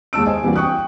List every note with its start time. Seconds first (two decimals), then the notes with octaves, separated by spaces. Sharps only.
0.13 D#2 G#3 A5 E6 D7
0.26 C5 D#5 G#5
0.43 E3 G3 A#3 C4 D4 F#4
0.56 G5 C#6 D#6 F#6